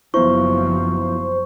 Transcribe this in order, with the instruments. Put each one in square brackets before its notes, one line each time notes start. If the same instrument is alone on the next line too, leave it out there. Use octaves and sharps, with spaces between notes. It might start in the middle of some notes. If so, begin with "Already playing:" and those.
[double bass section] F#1 F3 F#3 [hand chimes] B3 E4 [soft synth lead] C5 [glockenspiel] C#6